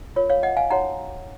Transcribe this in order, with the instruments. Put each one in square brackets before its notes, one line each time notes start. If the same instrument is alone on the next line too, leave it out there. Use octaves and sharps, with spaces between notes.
[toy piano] F4 A#4 C#5
C#5 F5
D#5 F#5
F5 G#5
D#4 F#4 C#5 F#5 A#5